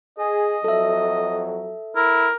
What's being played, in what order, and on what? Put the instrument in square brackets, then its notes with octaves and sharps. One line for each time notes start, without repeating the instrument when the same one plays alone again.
[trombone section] G#4 [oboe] D#5
[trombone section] F2 F#3 [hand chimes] A4 E5
[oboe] E4 [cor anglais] A#4